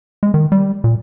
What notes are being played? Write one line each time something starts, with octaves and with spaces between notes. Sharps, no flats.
G#3
D#3
G3
A#2